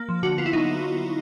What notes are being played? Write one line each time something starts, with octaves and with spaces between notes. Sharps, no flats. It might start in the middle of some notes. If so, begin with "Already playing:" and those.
Already playing: A#3
F3
D3 F#4
B3 F4
E4
F#3 D#4